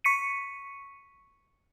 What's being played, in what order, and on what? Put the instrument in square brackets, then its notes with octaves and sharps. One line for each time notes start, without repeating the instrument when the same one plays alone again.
[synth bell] C#6 B6 C#7 D#7